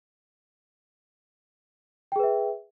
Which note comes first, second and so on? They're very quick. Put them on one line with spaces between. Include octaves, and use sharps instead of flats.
G5 G#4 B4 E5